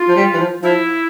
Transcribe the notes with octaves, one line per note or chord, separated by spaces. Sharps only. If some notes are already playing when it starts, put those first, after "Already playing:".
Already playing: F4
F3
G3
E3
F3
F3 E4